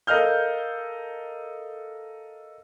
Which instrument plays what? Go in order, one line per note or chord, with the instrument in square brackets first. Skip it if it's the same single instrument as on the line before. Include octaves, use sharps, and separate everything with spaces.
[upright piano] A4 A#4 D#5 F5 F6 G6